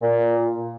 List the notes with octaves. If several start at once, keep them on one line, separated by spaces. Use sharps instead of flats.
A#2